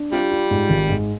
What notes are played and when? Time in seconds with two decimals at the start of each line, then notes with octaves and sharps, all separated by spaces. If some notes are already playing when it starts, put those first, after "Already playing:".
Already playing: D4
0.12 C3 G3 F4
0.32 F4
0.51 G#2
0.70 G#1
0.89 G#2